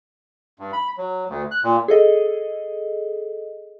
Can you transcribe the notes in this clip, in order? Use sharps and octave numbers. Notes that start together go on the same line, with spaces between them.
G2
B5
F#3
D2
F#6
A#2
G#4 A4 D#5